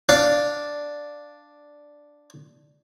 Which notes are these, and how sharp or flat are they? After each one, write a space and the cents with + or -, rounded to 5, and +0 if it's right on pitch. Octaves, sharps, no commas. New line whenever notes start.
D4 +0 F5 +0